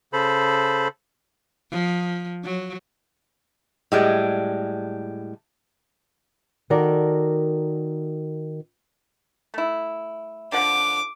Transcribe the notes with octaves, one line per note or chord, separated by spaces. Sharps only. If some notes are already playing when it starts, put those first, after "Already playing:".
C#3 A4 C5 B5
F3
F#3
A2 G3 G#3
D#3 F#4 A4 A#4 D5
A3 E4
D3 F3 F#5 D6